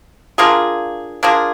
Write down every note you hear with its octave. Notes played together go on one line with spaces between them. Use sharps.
A#3 D4 F4 G#4
A#3 D4 F4 G#4